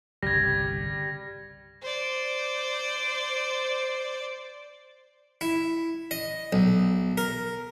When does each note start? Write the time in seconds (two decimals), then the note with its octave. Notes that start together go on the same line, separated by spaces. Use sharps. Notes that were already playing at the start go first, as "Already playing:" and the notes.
0.22 G1 C2 C#3 G3 G#6 A#6
1.82 C5 D5
5.41 E4
6.11 D#5
6.53 B1
7.18 A#4